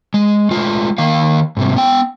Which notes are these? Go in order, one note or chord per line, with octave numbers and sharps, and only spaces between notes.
G#3
G#3 A3 F4
D#3 A#3 F5
G#2 C3 G3
B3 G5